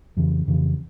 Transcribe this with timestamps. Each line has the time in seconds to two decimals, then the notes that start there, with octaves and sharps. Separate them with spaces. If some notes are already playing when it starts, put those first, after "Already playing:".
0.17 F2 C#3 E3
0.48 F2 C#3 E3